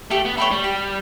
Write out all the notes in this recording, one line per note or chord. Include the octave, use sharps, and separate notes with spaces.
A3 G4
B3
A3 C#5 G5 B5
G3
G4